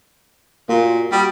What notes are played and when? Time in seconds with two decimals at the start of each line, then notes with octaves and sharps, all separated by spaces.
0.69 A#2 A#3 F#4
1.12 G3 F#4 G4 D#6